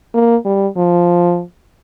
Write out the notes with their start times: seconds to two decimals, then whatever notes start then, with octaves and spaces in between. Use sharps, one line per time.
0.14 A#3
0.45 G3
0.77 F3